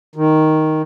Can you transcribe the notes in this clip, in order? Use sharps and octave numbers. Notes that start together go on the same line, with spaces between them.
D#3